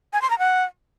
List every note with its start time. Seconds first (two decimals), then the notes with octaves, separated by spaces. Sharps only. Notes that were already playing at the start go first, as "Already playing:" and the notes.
0.13 G#5
0.22 C6
0.30 A#5
0.39 F#5